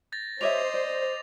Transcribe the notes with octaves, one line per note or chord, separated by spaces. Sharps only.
G6 A6 A#6
G4 C5 C#5 D#5 E5 D6 F7
D5